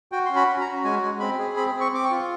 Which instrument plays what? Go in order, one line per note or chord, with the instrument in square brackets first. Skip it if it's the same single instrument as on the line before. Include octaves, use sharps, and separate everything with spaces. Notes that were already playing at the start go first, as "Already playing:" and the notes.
[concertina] F#4 G5
C#4 C6
B5
C#4
A#5
F#4
G#3 G#5
G#3
C4 B5
G#4
C4 B5
C4
C#6
C4 D6
C#6
F4